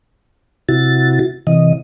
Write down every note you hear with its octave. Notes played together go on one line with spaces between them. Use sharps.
C3 E4 F#4 A6
C3 E3 D#5